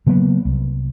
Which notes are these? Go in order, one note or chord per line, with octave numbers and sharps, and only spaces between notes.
C#3 F#3 A#3 B3
C2